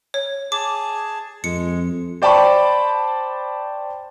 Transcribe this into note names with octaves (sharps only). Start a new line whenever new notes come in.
C#5
G#4 A5 D6
F2 G#3 C#7
C5 D5 G5 A5 B5 C#6